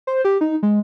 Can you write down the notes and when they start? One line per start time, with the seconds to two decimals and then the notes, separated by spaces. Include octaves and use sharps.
0.07 C5
0.25 G4
0.41 D#4
0.63 G#3